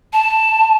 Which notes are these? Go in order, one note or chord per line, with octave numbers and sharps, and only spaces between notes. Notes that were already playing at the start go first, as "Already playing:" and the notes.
A5